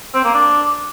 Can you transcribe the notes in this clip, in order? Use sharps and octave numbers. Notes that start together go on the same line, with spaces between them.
C4
A#3
D4